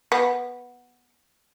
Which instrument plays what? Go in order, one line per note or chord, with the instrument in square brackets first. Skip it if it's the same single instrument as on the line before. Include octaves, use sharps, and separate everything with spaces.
[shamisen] B3